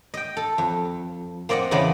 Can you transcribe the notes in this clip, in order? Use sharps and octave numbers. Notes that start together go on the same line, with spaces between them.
D#5 G5
A4
F2
A#3 C4 D5 D#5 F#5
E2 C#3 B3 D5 D#5 B5